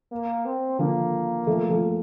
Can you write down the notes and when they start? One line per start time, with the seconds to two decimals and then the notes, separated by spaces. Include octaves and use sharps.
0.12 A#3
0.45 C4
0.79 D3 F3 A#3
1.47 F3 A3
1.70 F3 A3